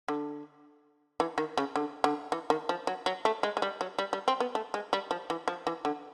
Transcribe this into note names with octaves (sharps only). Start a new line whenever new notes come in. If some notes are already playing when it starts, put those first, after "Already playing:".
D3
E3
D#3
C#3
D3
D3
E3
D#3
F3
F#3
F#3
A3
G#3
G#3
G3
F#3
G3
G3
C4
B3
A3
G#3
G3
F3
E3
F3
E3
D3